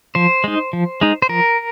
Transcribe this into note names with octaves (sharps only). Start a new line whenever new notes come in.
F3 C5
G#3 D#4
F3
G#3 D#4
C5
F3 A#4